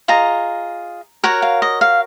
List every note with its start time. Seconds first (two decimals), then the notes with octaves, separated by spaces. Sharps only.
0.08 F4 G#4 D#5 A#5
1.24 F#4 A#4 C#5 F#5
1.42 F5
1.62 D#5
1.81 F5